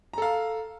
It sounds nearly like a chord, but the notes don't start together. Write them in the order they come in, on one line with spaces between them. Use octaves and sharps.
A#5 A4 F5